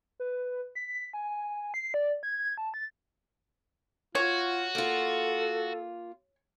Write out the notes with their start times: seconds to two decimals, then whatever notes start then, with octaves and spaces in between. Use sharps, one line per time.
0.20 B4
0.75 B6
1.13 G#5
1.74 C7
1.94 D5
2.23 G#6
2.58 A5
2.74 A6
4.15 F4 F#4 C#5
4.75 A#3 F4 A4